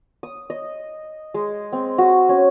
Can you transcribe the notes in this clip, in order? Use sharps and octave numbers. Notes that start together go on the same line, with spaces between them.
D#6
D#5
G#3
C4
F#4
C#4